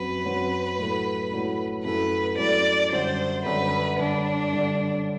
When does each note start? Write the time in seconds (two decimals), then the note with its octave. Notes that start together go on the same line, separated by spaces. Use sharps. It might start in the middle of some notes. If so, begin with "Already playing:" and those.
Already playing: F#2 F#3 C4 F#4 B4
0.25 F#2 F#3 C4 F#4
0.79 A2 F#3 A3
1.32 A2 F#3 A3
1.84 F#2 F#3 A3 E4 A4 B4
2.38 F#2 F#3 A3 E4 A4 D5
2.92 F#2 D3 G3 C5
3.45 F#2 D3 G3 B4
3.98 G2 D3 G3 D4
4.53 G2 D3 G3